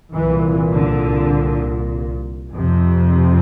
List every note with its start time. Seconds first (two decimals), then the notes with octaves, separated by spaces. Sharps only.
0.13 C2 A#2 E3
0.74 D3
2.54 F2 C3